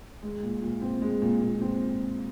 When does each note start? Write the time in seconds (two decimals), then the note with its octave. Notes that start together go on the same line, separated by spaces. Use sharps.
0.23 G#3
0.43 A#2
0.62 A#2
0.82 C4
1.02 G#3
1.22 A#2
1.42 A#2
1.61 C4